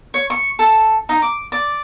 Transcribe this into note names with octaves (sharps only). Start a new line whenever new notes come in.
C#5
C#6
A4
D#4
D6
D5